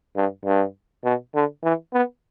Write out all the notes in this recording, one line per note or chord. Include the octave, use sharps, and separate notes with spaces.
G2
G2
B2
D3
E3
B3